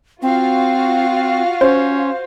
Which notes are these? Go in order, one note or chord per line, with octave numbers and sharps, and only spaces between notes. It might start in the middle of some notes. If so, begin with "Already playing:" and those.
C4 F4 F#4 F5
C#4 C5